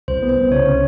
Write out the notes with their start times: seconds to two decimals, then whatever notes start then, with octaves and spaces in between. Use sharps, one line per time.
0.08 C2 C5
0.22 B3
0.29 C5
0.37 C2
0.51 C#3 C#5
0.66 C#4